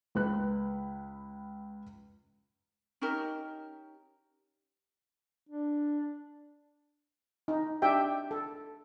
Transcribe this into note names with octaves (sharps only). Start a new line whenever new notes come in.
C#2 B4 F#6
C#4 D#4 G4 A#4
D4
D#4
D4 G4 E5 G5
A4